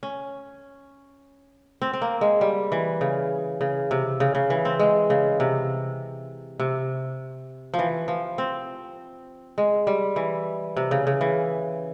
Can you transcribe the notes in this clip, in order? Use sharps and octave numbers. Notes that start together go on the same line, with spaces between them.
C#4
C4
C4
A#3
G#3
G3
E3
C#3
C#3
C3
C#3
C#3
E3
C4
G#3
C#3
C3
C3
F3
E3
F3
C4
G#3
G3
E3
C3
C#3
C#3
E3